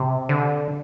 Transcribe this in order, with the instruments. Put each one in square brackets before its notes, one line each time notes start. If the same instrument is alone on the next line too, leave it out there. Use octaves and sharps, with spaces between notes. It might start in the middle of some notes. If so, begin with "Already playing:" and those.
Already playing: [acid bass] C3
D3